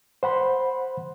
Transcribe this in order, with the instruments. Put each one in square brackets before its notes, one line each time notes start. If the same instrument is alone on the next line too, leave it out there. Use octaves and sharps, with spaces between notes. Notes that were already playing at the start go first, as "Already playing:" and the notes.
[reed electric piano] C5 F#5 B5 C6